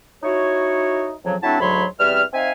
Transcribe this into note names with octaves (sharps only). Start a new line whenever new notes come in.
D#4 E4 F#4 C#5
F2 C#3 F3 F#3
F#3 A3 C4 D4 E4 A5
D2 G#2 F#3 C#5 B5 C6
E2 G3 C4 E5 F6
C4 D#4 E5 F5 G#5